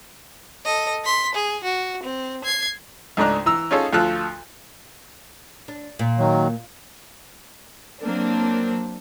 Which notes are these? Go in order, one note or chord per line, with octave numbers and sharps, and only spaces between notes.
A4 D#5
C6 B6
G#4
F#4
C4
G#6 C7
C#2 G#2 A3 D4 A#5 F#6
E3 A#5 E6
C#4 D#4 F4 G#4 A4 C#5
D2 F3 F4 A4 F#6
D4
A#2
D#3 F#3
F#3 A#3 C4 D4